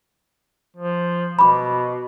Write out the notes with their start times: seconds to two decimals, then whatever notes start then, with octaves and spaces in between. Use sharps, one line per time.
0.77 F3
1.39 B2 B5 D6